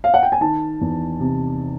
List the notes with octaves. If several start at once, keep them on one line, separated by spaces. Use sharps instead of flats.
F5
F#5
G5
G#5
D#3 A5
E2
C3